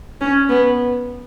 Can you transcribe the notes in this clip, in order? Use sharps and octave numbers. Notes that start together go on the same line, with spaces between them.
C#4
B3